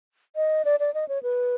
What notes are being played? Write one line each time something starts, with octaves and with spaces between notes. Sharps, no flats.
D#5
D5
D5
D#5
C#5
B4